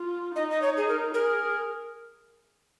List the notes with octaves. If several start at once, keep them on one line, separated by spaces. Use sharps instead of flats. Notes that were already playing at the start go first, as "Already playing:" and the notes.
Already playing: F4
D#4 D#5
D#5
C#5
G#4
A#4
G#4 A#4